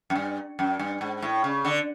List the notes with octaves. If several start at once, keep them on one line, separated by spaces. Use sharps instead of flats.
F#2
G2
F#2
G2
G#2
A2
C#3
D3